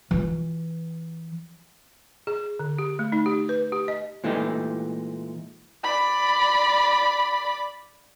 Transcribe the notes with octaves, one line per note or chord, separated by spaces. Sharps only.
E3 F4
G#4
D3
G4
A3
D#4
G4
B4
G4
D#5
A#2 E3 G#3 A3 D#4 G4
D5 B5